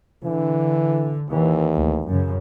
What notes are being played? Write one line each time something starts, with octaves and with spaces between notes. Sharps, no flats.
D3 E3
D#2 E3
D2
F#2 C#3